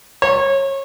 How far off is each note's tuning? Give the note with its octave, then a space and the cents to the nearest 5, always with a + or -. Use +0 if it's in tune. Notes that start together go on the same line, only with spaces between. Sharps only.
C#5 -25